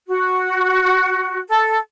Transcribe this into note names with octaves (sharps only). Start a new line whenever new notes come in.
F#4
A4